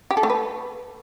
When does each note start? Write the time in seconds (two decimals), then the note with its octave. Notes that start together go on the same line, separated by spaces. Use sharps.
0.11 G4
0.17 A4
0.23 A3
0.30 B4